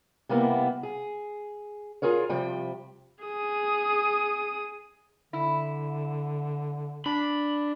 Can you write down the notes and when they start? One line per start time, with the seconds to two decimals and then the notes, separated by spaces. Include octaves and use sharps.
0.29 C3 G3 A#3 B3 E4
0.83 G#4
2.02 F4 G#4 A#4 C#5
2.29 C3 F3 G3 G5
3.24 G#4 D#6
5.33 D3 E4
7.06 D4 B5